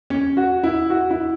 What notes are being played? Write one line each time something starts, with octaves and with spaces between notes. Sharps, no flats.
C#4
F#4
E4
F#4
E4